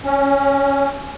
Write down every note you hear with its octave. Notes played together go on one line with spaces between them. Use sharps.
C#4